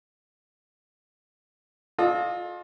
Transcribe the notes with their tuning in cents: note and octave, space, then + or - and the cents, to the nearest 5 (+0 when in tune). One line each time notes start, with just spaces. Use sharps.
F4 +25 A4 -40 D#5 -25